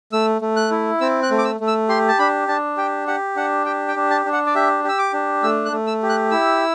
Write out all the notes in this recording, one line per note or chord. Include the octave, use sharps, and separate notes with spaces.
A3 E6
A3
F#6
E4
C4 E6
F#6
A3
D6
E6
A3
E6
G4 C6
A5
D4 B5
D4 A5
G4 G5
G4 F#5
D4 F#5
G4 G5
G5
D4
A5
D4
F#5
D5
G4 E5
G4
E6
D6
D4
A3 E6
F#6
A3
E6
G4
F#6
E4 E6